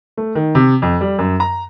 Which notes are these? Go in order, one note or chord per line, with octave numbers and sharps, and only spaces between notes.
A3
D#3
C3
F2
G3
F#2
A#5